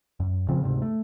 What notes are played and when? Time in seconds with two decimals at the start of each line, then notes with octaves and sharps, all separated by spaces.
0.20 F#2
0.48 A#2 C#3 F3 C4
0.63 D2 G#2 C3
0.82 A3